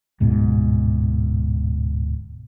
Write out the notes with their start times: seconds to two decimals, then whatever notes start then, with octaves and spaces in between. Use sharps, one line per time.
0.20 D1 G#2 B2